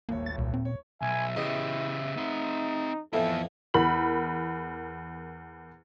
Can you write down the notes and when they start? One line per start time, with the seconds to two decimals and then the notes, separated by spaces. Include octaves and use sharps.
0.09 D#1 G#1 A#3 C#5
0.26 A6
0.38 C2 A#2
0.54 C4
0.65 C#5
1.02 B1 E5 G#5
1.36 E2 C#3 E4 G4 D#5
2.17 C4 D#4 F#5
3.13 F2 A2 E3 B3 E4 A4
3.74 E2 A#4 B5 F#7